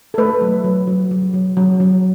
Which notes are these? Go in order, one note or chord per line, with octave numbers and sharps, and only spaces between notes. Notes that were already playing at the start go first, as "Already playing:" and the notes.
A4
A3 B4
F#3
F#3
F#3
F#3
F#3
F#3
F#3